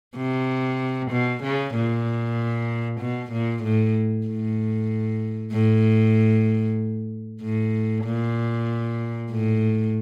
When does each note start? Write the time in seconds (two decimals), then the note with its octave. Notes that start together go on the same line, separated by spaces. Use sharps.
0.17 C3
1.11 B2
1.43 C#3
1.75 A#2
3.00 B2
3.32 A#2
3.63 A2
4.27 A2
5.53 A2
7.42 A2
8.04 A#2
9.30 A2